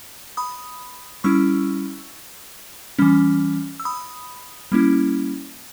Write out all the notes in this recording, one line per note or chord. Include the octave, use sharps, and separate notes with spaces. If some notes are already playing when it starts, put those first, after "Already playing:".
B5 D#6
G3 C#4 E4 C#6 E6
E3 G3 C#4
E6
B5 D#6
G3 A#3 C#4 E4